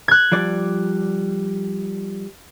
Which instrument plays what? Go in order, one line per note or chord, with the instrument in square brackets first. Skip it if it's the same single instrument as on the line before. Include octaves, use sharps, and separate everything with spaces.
[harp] F#6 G#6
[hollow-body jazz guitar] F3 G3 D5